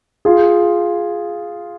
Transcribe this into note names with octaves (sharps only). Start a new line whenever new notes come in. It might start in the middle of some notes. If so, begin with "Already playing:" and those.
F4 G#4